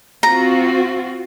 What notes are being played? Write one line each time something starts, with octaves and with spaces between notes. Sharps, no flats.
C4 F4 F#4 A#5